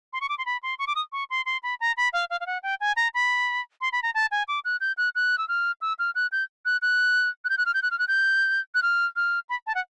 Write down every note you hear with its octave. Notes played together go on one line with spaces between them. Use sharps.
C6
C#6
D6
C6
B5
C6
C#6
D6
D#6
C#6
C6
C6
B5
A#5
B5
F5
F5
F5
F#5
G5
G#5
A#5
B5
C6
B5
A#5
A5
G#5
D6
F#6
G6
F#6
F#6
E6
F6
E6
F6
F#6
G6
F#6
F#6
F#6
G6
F#6
F6
G6
F#6
F6
F#6
G6
F#6
F6
F6
B5
A5
F#5